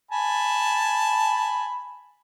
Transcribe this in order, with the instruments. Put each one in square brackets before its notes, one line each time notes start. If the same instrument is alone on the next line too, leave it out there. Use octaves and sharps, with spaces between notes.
[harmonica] G#5 A5 B5